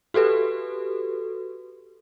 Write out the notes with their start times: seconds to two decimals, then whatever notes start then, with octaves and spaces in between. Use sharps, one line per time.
0.14 F#4 G4 A4 B4